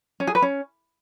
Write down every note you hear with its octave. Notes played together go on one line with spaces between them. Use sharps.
C#4
G#4
B4
C#4